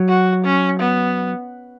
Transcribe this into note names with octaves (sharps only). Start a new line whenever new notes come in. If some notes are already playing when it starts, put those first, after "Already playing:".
Already playing: F#3
F#4
C#4
B3